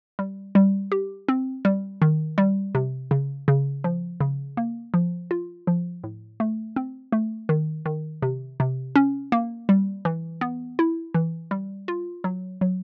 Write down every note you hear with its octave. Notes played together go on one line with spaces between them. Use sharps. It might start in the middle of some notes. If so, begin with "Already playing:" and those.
G3
G3
G4
C4
G3
D#3
G3
C3
C#3
C#3
F3
C#3
A#3
F3
F4
F3
A2
A3
C4
A3
D#3
D#3
C3
C3
C#4
A#3
G3
E3
B3
E4
E3
G3
F4
F#3
F#3